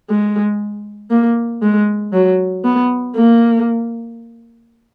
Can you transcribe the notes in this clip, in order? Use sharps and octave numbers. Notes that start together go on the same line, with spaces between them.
G#3
A#3
G#3
F#3
B3
A#3